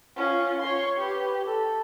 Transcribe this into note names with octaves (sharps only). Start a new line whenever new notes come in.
C#4 F4
C#5 C6
G4 B4
A4